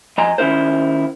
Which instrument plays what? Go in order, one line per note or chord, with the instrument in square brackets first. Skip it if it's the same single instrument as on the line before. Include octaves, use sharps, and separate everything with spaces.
[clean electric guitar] F2 D#5 G#5 A#5
D#3 C#4 E4 A#4 C5